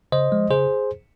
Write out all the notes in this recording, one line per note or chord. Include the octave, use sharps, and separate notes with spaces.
C#3 C5 D#5
F3 G#3
C#3 G#4 C5